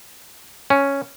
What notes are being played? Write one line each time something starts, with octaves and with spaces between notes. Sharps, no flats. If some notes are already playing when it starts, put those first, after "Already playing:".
C#4